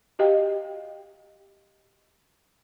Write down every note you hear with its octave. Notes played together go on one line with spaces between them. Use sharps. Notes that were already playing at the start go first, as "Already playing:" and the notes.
F#4 G4 D#5 F5 G5